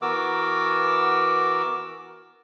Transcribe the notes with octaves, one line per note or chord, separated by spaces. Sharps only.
E3 B3 F#4 A#4 D6 E6